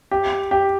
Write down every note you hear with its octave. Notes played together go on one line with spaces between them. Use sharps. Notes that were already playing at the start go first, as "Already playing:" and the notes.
G4
G4